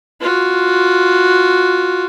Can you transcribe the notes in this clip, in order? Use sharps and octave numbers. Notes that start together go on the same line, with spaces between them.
F4 F#4